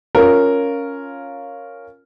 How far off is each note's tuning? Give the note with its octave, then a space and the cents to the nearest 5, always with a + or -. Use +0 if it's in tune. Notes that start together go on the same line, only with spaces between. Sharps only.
C#4 +0 F4 +5 A#4 -5